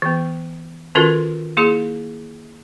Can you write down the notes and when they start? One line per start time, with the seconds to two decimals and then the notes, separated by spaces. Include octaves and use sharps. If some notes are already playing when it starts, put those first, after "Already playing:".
0.02 E3 B3
0.95 D#3 C#4 F4 F#4 A4 A#4
1.57 A#3 E4 G#4